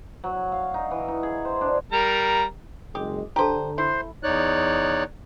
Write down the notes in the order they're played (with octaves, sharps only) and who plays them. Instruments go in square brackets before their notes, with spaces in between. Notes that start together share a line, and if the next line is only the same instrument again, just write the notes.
[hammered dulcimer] F#3
F5
D#4
E3
D#4
G#4
C5
D4
[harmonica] G3 A#4 A#5
[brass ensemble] F#1 G#3 [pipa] G4 [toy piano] D#6
[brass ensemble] D3 [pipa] G4 C5 [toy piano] A4 A5 A#5
[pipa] E4 [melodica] C5 C6
[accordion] E2 D#4 C#5 D5 F#6